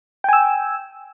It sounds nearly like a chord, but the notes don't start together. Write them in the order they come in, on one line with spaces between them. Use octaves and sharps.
G5 G#5 E6